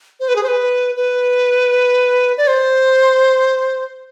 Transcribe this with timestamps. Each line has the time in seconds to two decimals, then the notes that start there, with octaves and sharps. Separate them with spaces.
0.20 C5
0.28 B4
0.36 G#4
0.43 C5
0.48 B4
0.96 B4
2.38 D5
2.47 C5